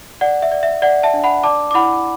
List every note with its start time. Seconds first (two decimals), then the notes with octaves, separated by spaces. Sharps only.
0.21 D5 F#5
0.42 E5
0.52 D5
0.63 E5
0.82 D5 F#5
1.03 E5 A5
1.14 D4
1.24 F#5 B5
1.44 D5 A5 D6
1.71 D6
1.74 E4 F#5 B5